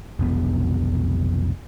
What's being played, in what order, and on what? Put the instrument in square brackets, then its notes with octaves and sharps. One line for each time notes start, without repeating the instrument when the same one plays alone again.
[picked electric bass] F1 B1 B3